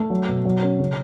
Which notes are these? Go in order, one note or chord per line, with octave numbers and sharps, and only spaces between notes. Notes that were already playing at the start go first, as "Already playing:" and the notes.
Already playing: A3
F#3
B2
F#3
C#4
C#3